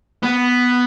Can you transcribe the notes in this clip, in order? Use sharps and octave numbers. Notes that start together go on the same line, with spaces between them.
B3